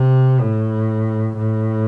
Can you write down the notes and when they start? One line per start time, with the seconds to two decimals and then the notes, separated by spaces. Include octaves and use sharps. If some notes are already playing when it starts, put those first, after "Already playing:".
Already playing: C3
0.41 A2
1.37 A2